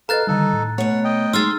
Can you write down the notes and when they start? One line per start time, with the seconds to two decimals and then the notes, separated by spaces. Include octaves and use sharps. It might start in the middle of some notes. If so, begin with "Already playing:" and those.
0.09 A4 B4 D#5 F5 A#5 F#6 A6
0.27 D3 D#3 G3 D#4 A4
0.53 A2
0.78 B2 A3 C#5 F#5
1.04 D#5 G5
1.33 G#3 D#4 C6 E6 F6 A6